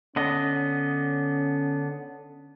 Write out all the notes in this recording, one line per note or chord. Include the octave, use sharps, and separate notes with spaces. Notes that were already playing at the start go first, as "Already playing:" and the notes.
D3 B3 C#4 D#5